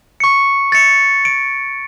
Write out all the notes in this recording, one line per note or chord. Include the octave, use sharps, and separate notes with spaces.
C#6 C#7
A6 C#7
D7